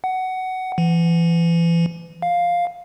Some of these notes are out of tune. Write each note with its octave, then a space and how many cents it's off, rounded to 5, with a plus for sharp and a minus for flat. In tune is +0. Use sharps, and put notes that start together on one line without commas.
F#5 +15
E3 +35
F5 +5